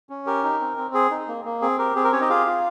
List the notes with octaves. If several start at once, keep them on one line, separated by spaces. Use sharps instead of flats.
C#4
G4 A#4
D#4
C4
C4
G#4
D#4
A#3
A#3
C4 G#4
G4 A#4
C4 G#4
A#4
C#4 G4 C#5
D#4 D#5
F4 G#4 F5
F4